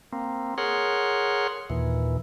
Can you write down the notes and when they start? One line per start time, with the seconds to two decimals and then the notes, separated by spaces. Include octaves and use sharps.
0.13 A#3 C4
0.58 G#4 A#4 C#5 F#5 C6
1.70 D#2 A#2 E3